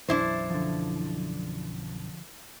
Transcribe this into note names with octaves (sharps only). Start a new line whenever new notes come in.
B1 F#2 E3 D4 E4 C5
D3 F3